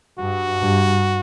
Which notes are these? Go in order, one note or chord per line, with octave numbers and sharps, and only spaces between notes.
G2 F#4
G2